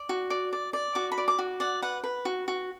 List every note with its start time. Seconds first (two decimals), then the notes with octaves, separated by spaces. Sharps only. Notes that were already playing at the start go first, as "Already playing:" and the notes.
Already playing: D5
0.09 F#4
0.30 D5
0.53 D5
0.73 D5
0.95 F#4 D6
1.12 B5
1.18 D5
1.28 D6
1.39 F#4
1.60 D5 F#5
1.82 B4 F#5
2.04 B4
2.25 F#4
2.48 F#4